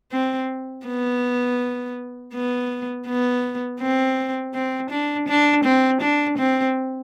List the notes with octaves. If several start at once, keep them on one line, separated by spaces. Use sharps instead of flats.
C4
B3
B3
B3
C4
C4
D4
D4
C4
D4
C4